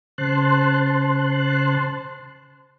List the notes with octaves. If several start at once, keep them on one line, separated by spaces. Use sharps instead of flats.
C#3 C5 A5 C6 F#6